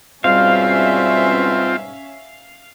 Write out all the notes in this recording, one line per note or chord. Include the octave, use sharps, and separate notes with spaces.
G#2 B2 G3 C4 C#4 F4 E5 F5